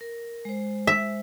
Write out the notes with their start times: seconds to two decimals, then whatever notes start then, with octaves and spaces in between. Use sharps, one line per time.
0.01 A#4
0.45 G#3 C5
0.87 E5